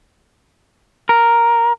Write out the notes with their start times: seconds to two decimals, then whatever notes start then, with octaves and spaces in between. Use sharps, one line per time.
1.09 A#4